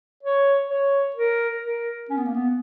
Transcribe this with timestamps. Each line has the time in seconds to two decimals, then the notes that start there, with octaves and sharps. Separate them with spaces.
0.23 C#5
0.70 C#5
1.16 A#4
1.63 A#4
2.09 C#4
2.17 B3
2.25 A#3
2.34 B3